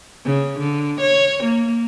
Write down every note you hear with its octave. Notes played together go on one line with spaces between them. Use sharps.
C#3
D3
C#5
A#3